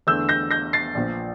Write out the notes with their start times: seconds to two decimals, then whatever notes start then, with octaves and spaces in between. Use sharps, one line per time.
0.07 E2 D3 A3 E6 G6
0.29 G6 A#6
0.51 G6 A#6
0.73 A6 C7
0.95 A#1 A#2 F3